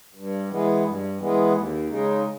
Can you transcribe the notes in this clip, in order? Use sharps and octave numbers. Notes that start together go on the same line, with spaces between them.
G2
E3 G#3 B3
G2
E3 G#3 B3
D#2
C#3 G#3 D#4